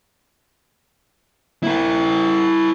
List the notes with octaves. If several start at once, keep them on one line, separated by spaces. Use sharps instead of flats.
E4 A#4